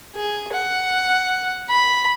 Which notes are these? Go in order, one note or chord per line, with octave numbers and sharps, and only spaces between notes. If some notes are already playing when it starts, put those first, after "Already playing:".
G#4
F#5
B5